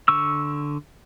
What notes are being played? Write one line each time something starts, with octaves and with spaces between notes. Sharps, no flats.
D3 C#6 E6